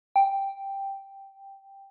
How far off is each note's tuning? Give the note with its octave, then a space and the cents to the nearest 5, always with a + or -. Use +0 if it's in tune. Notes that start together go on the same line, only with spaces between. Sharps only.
G5 +0